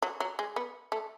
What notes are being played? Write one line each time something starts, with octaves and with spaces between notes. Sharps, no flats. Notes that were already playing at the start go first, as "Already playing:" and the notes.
F#3
F#3
G#3
B3
A3